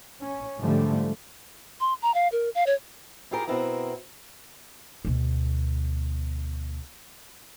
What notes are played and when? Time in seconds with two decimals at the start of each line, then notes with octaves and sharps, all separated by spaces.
0.23 C#4
0.59 G#2 D3 F3 G3 A3
1.80 C6
2.02 A#5
2.14 F5
2.32 A#4
2.55 F5
2.67 C#5
3.31 E4 F4 G4 G#4 A#4
3.48 B2 B3 C4 E4 A#4 A#5
5.05 D2 B2